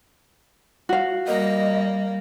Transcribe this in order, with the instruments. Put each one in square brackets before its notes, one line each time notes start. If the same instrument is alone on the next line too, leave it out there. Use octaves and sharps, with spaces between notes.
[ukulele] F#4 F5
[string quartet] G3 A#3 [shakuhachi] D#5